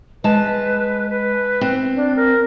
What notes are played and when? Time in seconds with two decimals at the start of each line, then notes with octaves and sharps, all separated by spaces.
0.24 G#3 B4 A5
1.09 B4
1.61 C4
1.95 D4
2.16 A#4